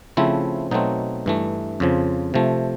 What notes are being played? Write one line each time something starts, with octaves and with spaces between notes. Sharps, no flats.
C#3 F3 A3 C4 E4
B2 F#3 A3 C4 D#4
G2 E3 A3
F2 C#3 F3
C3 F3 A3